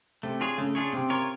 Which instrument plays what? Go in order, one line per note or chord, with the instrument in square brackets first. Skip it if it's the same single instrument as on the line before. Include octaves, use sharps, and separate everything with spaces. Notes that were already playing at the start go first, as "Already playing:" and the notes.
[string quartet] C3 [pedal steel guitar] A3
[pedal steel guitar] D4 F4 G#4 C#5
[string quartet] C#3 [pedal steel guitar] A3
[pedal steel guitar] D4 F4 G#4 C#5
[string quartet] C3 [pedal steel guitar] C4
[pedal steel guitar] F4 A#4 C#5